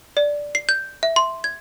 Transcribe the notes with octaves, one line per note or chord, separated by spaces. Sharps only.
D5
C7
G6
E5
C6
G#6